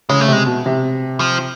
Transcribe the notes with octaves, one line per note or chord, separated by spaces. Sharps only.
C#3 G#3
A3
C3 G#3
B2
C3
F3